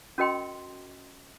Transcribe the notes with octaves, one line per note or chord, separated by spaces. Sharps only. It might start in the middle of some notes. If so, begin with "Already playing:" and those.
C#4 F#4 A#4 D#5 G5 C6